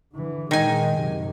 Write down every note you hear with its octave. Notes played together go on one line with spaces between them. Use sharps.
D3 E3
A#2 D#3 G#3 G#5
F#2 C3